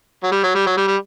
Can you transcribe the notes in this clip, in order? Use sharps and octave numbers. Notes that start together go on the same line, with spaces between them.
F#3
G3
F#3
G3
F#3
G3
G3